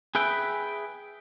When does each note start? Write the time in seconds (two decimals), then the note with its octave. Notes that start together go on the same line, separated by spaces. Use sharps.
0.15 G#4 B4 E5 G5